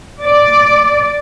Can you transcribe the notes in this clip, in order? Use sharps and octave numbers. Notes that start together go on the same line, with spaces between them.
D5